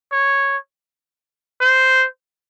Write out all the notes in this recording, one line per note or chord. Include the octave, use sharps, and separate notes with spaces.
C#5
C5